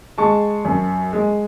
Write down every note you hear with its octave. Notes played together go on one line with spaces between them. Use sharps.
G#3 A5 C#6
F#2
G#3